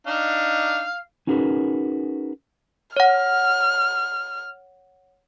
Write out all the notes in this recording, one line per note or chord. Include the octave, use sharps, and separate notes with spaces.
D4 D#4 F5
C#4 D#4 F#4 G#4 A#4 B4
C#5 F#5 F6